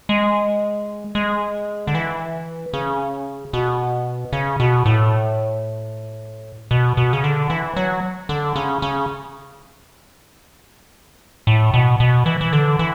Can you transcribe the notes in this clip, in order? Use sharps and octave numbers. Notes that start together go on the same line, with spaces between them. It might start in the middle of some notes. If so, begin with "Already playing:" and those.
G#3
G#3
D3
E3
C#3
B2
C#3
B2
A2
B2
B2
C#3
D3
E3
F#3
D3
C#3
C#3
A2
B2
B2
E3
E3
D3
E3